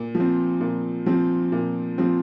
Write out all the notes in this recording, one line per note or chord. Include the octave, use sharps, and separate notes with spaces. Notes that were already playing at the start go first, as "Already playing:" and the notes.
Already playing: A#2
F3
C4
A#2
F3 C4
A#2
F3 C4